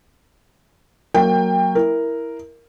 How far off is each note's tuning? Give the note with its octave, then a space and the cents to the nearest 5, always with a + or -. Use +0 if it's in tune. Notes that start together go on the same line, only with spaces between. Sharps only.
F#3 +0 A#3 -10 G5 +25
E4 +0 A#4 +0